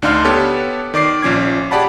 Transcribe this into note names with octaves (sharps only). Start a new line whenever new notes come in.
D2 D4 D#4 F5 C6 F6
B3 G4 A4 B4 C#5 A5
D#3 D5 D6 C7
A#1 F3 C#4 D6 G#6
G4 G#4 D5 F#5 A5 B5